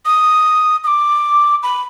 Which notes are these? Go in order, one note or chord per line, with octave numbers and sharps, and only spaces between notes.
D#6
D#6
D6
B5